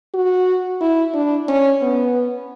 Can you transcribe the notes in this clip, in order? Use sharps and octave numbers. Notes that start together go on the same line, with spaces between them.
F#4
E4
D4
C#4
B3